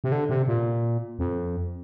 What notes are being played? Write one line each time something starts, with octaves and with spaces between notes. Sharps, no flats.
C3
D3
C3
A#2
F2